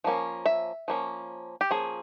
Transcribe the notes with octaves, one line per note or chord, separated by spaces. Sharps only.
F3 A#3 C#4
E5
F3 A#3 C#4
G4
F3 A#3 C#4 G#4